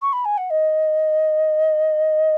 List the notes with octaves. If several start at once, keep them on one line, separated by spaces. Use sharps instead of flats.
C#6
B5
G#5
F#5
D#5